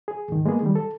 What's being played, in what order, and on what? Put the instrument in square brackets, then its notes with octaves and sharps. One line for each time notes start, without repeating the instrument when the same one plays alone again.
[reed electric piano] G#4
D#2 G#2 D#3
G#3 A#3 B3 G#4
D#3 G3
A4